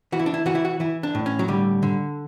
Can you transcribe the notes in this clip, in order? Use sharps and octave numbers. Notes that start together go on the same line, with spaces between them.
E3 F#4
E4
D4
E4
E3 F#4
E4
F#4
E3 E4
D4
A2
C#4
F#3
D3 G3
D3